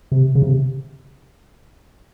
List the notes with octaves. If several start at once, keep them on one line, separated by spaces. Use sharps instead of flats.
C3
C#3
C3